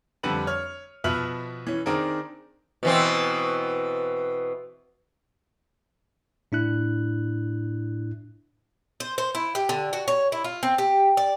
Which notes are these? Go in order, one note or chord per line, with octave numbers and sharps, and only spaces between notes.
F2 D3 G3 B4 F#7
C#5 F6
B2 F3 B4 E5 F6 F#7
E3 C#4
D#3 C4 D4 G#4 A#4
B2 E3 C4
A2 D4 E4 F#6
C5
C5
E4
G4
D3
F#4
C#5
E4
F4
C4
G4
D5